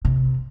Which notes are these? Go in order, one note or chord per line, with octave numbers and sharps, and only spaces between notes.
C3